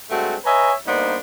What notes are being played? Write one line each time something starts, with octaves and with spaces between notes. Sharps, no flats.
G2 G#3 A3 C4 F#4 A5
B4 C#5 D#5 E5 G#5 A#5
G2 A#3 B3 D4 D#4 C5